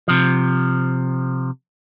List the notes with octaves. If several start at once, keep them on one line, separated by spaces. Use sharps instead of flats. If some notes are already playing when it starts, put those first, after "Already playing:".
C3 F3